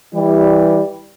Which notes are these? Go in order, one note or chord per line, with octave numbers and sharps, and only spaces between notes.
E3 G3